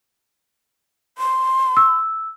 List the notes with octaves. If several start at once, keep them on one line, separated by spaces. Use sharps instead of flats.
C6
E6